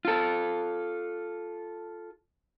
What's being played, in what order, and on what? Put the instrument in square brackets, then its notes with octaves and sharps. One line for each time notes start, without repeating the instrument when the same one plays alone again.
[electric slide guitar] F4 A4